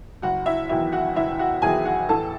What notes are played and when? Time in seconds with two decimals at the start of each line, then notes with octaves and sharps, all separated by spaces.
0.22 F#1 F#4 F#5
0.46 E4 E5
0.69 E2 D#3 F#3 E4 E5
0.92 F#4 F#5
1.16 F#1 E4 E5
1.39 F#4 F#5
1.62 E2 D#3 F#3 G#4 G#5
1.85 F#4 F#5
2.09 A1 A4 A5